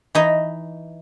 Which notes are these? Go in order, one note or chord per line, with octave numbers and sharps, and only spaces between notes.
E3 D#4 D#5